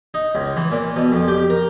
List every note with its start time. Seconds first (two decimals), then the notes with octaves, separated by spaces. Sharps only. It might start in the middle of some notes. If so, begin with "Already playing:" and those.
0.14 D#4
0.35 C#2
0.56 E3
0.72 A#2
0.96 B2
1.12 F2
1.28 G4
1.50 A#4